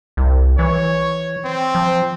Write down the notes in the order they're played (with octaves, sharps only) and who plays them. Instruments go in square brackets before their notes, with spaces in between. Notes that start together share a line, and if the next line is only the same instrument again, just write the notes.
[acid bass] C2
[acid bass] E3 [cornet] C#5
[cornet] C4
[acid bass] F3